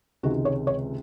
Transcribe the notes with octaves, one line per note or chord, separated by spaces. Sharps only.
C#2 C3 D#3 G#3 F#4
C#5
C#5